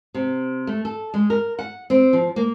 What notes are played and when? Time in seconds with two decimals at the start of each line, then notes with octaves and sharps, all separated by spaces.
0.14 C3
0.67 A3
0.85 A4
1.14 G#3
1.30 A#4
1.59 F#5
1.90 C4
2.13 F3
2.36 A#3